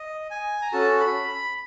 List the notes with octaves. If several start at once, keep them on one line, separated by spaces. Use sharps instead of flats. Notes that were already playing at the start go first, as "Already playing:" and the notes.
Already playing: D#5
G#5
A#5
C#4 F#4 A4 A5
B5
B5